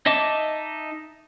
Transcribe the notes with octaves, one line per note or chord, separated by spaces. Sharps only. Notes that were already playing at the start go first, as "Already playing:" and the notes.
D#4 D#5 E5 A5 D6